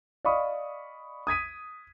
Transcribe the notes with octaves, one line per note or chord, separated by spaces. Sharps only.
D5 D#5 F5 B5 C#6 D#6
D#6 G#6 B6 D#7